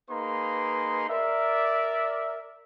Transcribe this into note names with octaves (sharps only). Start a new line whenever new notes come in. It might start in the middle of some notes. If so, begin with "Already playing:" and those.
A#3 D#4 G#4 B4 A#5 C6
A#4 D5 E5